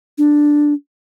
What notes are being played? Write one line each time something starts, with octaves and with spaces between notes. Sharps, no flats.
D4